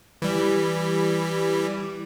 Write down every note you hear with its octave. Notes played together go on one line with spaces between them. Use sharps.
E3 G3